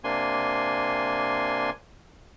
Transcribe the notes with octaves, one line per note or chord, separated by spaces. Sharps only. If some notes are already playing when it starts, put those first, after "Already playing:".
C3 A#3 D4 G#5 C6